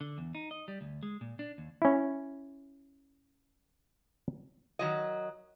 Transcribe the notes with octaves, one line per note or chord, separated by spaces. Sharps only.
D3
E2
D#4
D#5
G3
D2
G#3
A#2
D4
D#2
C#4 E4
D#3 F#3 D#5